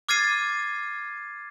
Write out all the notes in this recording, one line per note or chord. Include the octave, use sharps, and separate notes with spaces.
D6 F6 G#6 A6 C7 D#7